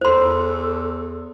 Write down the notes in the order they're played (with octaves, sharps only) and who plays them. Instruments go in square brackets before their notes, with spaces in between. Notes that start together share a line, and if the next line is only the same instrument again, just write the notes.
[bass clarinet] E2 [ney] A4 [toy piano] C5 C6